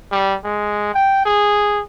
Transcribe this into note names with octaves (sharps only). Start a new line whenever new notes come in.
G3
G#3
G5
G#4